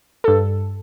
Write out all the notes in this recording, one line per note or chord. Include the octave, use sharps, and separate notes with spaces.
G2 A4